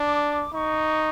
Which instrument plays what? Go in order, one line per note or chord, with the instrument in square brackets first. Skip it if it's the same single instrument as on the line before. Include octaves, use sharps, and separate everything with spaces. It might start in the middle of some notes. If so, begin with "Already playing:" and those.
Already playing: [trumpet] D4 [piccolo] D6
[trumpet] D#4 [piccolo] C#6